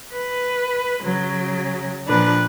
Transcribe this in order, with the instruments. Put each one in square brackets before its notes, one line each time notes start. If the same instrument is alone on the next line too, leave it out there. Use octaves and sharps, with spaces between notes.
[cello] B4
C#3 F#3
[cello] A#2 F3 [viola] D4 B4